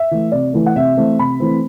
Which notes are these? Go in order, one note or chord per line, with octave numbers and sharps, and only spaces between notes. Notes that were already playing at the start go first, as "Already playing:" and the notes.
Already playing: E5
E3 A3
C3 D5
E3 A3
F#5
C3 E5
E3 A3 C4
C3 B5
E3 A3 C4